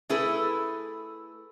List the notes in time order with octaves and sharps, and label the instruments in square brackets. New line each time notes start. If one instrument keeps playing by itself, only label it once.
[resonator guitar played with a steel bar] A3 E4 G#4 A4 B4